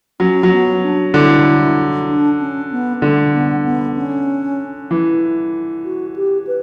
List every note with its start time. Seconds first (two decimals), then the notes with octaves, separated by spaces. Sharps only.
0.20 F#3 C#4
0.43 F#3
0.51 B3
0.83 D4
1.14 D3 E4
2.09 D4
2.40 C#4
2.71 B3
3.02 D3 A3
3.34 B3
3.65 B3
3.97 C#4
4.91 E3
5.85 F#4
6.16 G4
6.47 B4